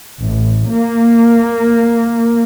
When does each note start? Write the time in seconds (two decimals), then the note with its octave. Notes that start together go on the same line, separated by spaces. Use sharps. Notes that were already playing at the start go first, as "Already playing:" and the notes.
0.22 A1
0.69 A#3